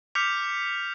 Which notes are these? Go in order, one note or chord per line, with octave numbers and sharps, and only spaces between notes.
D6 F6 G6 B6 C#7 F7